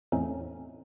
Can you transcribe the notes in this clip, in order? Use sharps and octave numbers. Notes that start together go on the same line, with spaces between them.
E2 A2 A3 C4 C#4 D#4